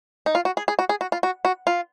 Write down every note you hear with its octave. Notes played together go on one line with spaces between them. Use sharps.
D#4
F4
F#4
G#4
G#4
F#4
G#4
F#4
F4
F#4
F#4
F4